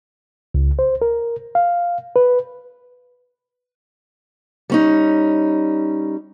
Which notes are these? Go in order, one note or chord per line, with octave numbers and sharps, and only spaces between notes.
C#2
C5
A#4
F5
B4
G3 C#4 D#4